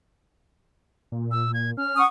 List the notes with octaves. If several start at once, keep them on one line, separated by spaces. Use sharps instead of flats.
A#2
E6
G#6
C#4 F6
F#5 C#6 D#6